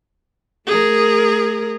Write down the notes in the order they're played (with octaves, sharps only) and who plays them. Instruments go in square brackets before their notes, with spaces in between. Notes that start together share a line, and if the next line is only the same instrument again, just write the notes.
[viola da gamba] A3 A#4 [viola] G#4